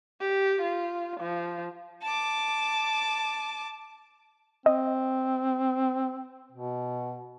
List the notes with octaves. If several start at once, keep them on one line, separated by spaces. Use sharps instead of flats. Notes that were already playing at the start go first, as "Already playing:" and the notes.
G4
F4
F3
A5 D6
C4 D#5
B2